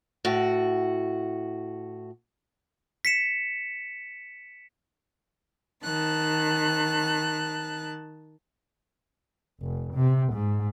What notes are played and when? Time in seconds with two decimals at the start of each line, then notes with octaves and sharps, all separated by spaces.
0.25 A2 F#4
3.05 B6 C#7 E7
5.84 D#3 A5 F#6
9.61 F1
9.94 C3
10.33 G#2